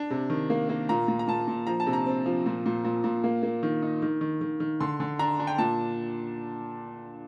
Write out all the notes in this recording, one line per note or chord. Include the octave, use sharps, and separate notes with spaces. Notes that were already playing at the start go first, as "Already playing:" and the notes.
Already playing: D4
C3
D#3
A#3
A#3
A#2 A#5
A#2
A#5
A#2 A5
A#2
F3 A#5
A5
C3
A#5
C4
F3
A#2
A#2
A#2
A#2
A#3
A#3
D#3
D#4
D#3
D#3
D#3
D#3
D3 C6
D3
D4 A#5
D4
G5
A#2 A5